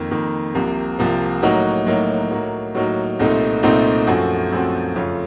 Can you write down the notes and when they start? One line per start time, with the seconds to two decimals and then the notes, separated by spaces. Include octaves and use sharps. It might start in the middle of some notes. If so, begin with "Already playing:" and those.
Already playing: F2 D#3 A#3
0.11 F2 D#3 A#3
0.55 C2 C3 F3 A#3
0.99 C2 C3 F3 A#3
1.42 A2 F#3 A#3 D#4 F#4
1.87 A2 F#3 A#3 D#4 F#4
2.31 A2 F#3 A#3 D#4 F#4
2.75 A2 F#3 A#3 D#4 F#4
3.19 C2 A#2 A3 C4 D#4
3.63 C2 A#2 A3 C4 D#4
4.07 F#2 F3 A3 C4 F#4
4.52 F#2 F3 A3 C4 F#4
4.96 F2 C#3 A3 C#4 F4